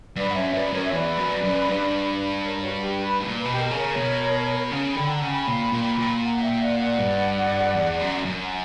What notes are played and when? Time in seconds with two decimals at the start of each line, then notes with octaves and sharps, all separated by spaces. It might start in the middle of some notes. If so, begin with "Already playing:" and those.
0.16 G2 B4 D5
0.29 F#5
0.35 F#2 C#5 E5
0.54 F#2 B4 D5
0.73 F#2 A#4 C#5
0.85 E5
0.92 E2 B4 D5
1.17 F#2
1.43 F#2
1.68 G2
2.44 A#4 C#5
2.63 F#4
2.81 G4
3.01 B4
3.20 A#2
3.38 B4
3.45 B2 G4
3.58 A#4
3.71 C#3
3.77 A#4 C#5
3.96 B2
4.71 C#3 A#4 C#5
4.90 G5 B5
4.97 D3
5.09 F#5 A#5
5.22 C#3
5.28 G5 B5
5.47 A#2
5.72 A#2
5.98 A#2
6.23 F#5 A#5
6.42 E5 G5
6.61 D5 F#5
6.79 D5 F#5
6.98 G2
7.75 E2
8.01 F#2
8.25 F#2
8.41 F#5